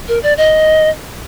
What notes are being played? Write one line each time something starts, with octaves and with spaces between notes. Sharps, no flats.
A#4
D5
D#5